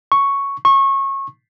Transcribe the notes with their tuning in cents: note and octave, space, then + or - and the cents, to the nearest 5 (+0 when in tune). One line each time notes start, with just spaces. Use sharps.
C#6 +0
C#6 -25